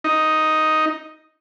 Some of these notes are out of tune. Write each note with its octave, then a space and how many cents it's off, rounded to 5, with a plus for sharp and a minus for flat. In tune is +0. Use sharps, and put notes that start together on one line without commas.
D#4 +5